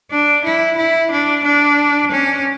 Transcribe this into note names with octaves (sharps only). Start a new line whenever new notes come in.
D4
E4
E4
D4
D4
C#4